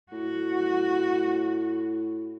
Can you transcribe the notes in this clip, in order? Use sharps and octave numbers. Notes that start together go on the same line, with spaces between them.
A2 F#4